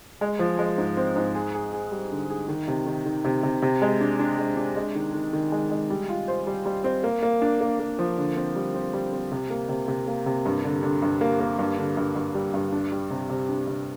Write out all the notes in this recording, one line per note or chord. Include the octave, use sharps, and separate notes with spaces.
G#3
F3
G#3
G#2
C4
G#2
G#4
G#4
G#4
G3
D3
G#4
D#3
C3
D#3
D#3
C3
C3
C3
G#3
D4
D4
G#3
D4
G#3
D#3
D#3
D#3
G#3
G#3
G3
F4
C5
G3
G3
C4
A#3
A#3
D4
A#3
A#3
F3
D3
C4
G3
C4
G3
C4
C3
A#3
C3
C3
A#3
C3
G2
D3
D3
G2
A#3
A#3
G2
D3
G2
G2
G3
G2
D4
G3
C3
C3
D4
C3